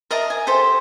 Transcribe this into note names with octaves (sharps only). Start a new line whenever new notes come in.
A#4 D#5 E5 A5
G#5
G4 A4 C5